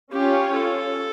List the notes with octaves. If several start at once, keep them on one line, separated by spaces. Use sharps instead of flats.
C#4 F4 G4 C#5
A4